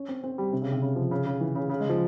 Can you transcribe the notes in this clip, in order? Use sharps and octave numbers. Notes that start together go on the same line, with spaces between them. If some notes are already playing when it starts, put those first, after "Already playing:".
Already playing: C#4
C4
C4
G3
C3
C#3
C3
C#3
F3
C#3
C#3
E3
C#3
C#3
G#3
F3